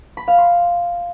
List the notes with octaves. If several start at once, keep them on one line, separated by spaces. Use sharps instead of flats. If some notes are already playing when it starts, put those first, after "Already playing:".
B5
F5
C6